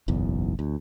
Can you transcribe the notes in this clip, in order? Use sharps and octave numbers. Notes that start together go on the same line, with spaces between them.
F#1 B1 E2
D2